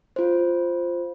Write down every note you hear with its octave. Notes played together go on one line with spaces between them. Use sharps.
F4 C5